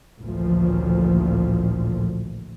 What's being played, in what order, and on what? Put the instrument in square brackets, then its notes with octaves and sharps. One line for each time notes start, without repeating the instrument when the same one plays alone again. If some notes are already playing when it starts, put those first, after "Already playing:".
[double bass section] A1 D2 A#2 F3